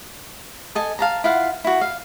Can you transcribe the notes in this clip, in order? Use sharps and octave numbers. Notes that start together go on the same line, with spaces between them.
A4 D#5 G#5
F5 A5 A#5
E4 F4 F5 F#5
E4 F#4
F5